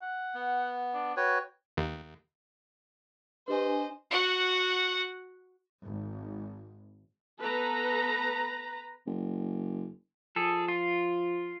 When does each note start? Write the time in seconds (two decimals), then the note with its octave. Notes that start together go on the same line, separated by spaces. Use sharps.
0.02 F#5
0.34 B3
0.94 D4
1.17 F#4 B4 C#5 G5
1.77 D#2
3.48 D4 G4 B4 C5 D#5 G#5
4.11 F#4 F#5
5.86 G#1
7.40 B3 A4 B4 A#5
9.07 F#1
10.36 F3 G#4 A4
10.68 F4